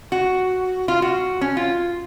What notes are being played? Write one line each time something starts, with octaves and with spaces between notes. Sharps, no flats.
F#4
F4
F#4
C#4
F4